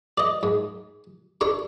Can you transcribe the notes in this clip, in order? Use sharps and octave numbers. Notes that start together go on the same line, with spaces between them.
D5 D#5
G#2
D4 A4 C#6